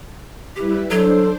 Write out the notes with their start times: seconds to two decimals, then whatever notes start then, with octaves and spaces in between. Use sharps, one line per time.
0.56 G3 E4 G4 B4
0.90 F#3 D4 A4 C5